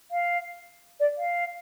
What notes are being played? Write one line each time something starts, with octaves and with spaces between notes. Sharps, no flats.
F5
D5
F5